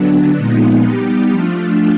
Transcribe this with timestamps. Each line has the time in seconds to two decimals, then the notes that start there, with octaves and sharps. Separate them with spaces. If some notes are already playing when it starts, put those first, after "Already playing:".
Already playing: D3 F#3 B3 D4
0.36 A#2 F3 G#3 B3 D#4
0.85 G3 B3 D#4 G4
1.31 F3 A3 D4 F4